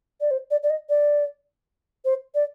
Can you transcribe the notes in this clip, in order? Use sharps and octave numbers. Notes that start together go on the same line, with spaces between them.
D5
C5
D5
D5
D#5
D5
C5
D5